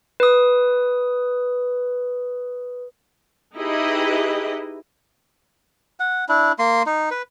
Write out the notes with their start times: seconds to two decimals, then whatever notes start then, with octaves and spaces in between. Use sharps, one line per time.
0.20 B4 D#6
3.55 D#4 E4 G4 G#4 B4 D#5
6.00 F#5
6.29 D4 E4
6.59 A#3 C6
6.86 D#4
7.11 B4